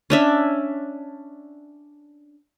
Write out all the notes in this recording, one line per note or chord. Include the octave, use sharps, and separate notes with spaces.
C#4 D4 E5